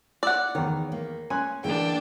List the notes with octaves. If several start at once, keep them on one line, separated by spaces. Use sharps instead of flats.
D5 F#5 E6
E2 D#3 C#5
A#3
C#4 G#5 C6 F#6
D3 E3 G#3 A#3 D4 G5